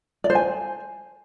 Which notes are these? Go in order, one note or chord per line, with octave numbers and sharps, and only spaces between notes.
D5
C5
G#5